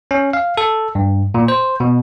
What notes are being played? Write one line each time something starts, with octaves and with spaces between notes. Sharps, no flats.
C#4
F5
A4
G2
A#2
C5
B2